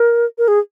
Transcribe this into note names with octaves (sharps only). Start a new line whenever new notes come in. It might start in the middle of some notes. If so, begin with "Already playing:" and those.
Already playing: A#4
A#4
G#4